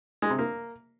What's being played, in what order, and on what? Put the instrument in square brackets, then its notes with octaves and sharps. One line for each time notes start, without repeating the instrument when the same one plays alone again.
[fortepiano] G#3
C3
A#3